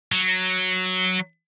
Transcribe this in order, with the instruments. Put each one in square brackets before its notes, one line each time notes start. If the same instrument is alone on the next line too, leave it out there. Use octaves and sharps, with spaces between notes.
[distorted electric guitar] F#3